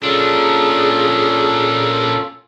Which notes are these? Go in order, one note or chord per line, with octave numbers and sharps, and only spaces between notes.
A#2 C#4 D4 F4 G#4 A4